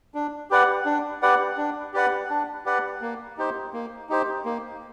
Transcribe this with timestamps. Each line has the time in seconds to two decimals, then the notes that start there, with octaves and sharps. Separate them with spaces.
0.14 D4
0.50 G4 B4 D5 F#5
0.86 D4
1.23 G4 B4 D5 F#5
1.57 D4
1.94 G4 B4 D5 F#5
2.30 D4
2.66 G4 B4 D5 F#5
3.01 A#3
3.37 D#4 G4 C5
3.73 A#3
4.09 D#4 G4 C5
4.45 A#3